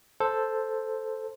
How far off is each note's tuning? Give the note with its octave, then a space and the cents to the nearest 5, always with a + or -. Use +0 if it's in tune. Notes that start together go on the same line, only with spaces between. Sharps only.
A4 +0 C5 +0